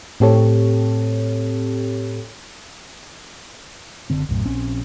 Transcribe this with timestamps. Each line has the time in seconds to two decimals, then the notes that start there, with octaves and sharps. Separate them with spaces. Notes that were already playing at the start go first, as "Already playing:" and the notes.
0.20 A2 C4 G4 A4 C#5
4.10 F#1 D3 C4
4.29 B1 F#2 A2
4.46 A#1 C4 C#4